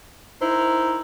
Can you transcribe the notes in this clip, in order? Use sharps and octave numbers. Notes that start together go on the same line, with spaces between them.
D#4 E4 A#4 C5